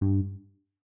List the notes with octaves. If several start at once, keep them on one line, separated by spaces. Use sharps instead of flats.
G2